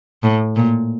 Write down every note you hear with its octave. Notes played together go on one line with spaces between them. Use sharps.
A2
A#2